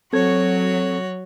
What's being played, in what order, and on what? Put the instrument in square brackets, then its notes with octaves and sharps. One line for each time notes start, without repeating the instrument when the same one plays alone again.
[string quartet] F#3 [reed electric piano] C4 A4 G#6 [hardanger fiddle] F#4 C#5